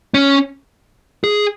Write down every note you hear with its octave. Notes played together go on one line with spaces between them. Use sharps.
C#4
G#4